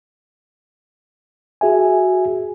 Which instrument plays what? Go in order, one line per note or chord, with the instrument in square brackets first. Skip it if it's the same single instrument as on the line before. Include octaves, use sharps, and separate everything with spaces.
[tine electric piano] F#4 G#4 E5 G#5